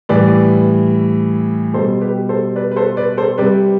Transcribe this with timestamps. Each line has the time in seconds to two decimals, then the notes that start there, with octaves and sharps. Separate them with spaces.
0.09 A2 E3 G3 B4 D5
1.73 B2 G3 A4 C5
2.01 G4 B4
2.29 A4 C5
2.56 B4 D5
2.72 B4
2.76 A4 C5
2.97 B4 D5
3.17 A4 C5
3.38 C3 G3 B4 D5